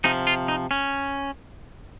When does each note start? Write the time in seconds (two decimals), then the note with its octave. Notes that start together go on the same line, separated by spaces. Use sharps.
0.04 C3 F3 D#4
0.27 F4
0.48 D#4
0.71 C#4